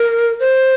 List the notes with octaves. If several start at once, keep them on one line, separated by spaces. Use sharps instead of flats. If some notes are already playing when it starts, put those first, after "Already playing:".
Already playing: A#4
C5